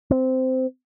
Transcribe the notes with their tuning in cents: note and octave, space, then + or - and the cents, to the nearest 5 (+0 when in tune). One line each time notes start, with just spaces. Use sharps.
C4 -15